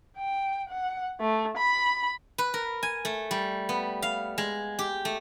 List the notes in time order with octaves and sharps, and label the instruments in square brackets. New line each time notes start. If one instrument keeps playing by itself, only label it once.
[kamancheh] G5
F#5
A3
B5
[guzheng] B4
A#4
G#5
A3
G3
B3
F5
G#3
G4
A3